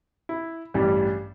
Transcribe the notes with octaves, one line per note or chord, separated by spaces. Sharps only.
E4
A1 G2 E3 G3